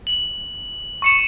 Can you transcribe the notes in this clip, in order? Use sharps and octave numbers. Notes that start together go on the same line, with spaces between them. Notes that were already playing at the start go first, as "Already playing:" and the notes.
F#7
C#6 C#7 E7